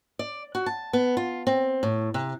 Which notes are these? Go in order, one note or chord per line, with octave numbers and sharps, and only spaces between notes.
D5
F#4
A5
B3
F4
C4
A2
C3